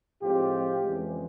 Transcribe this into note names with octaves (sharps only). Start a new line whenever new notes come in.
A2 F3 G#3 C4 F4 G4
F2 C#3 E3 G#3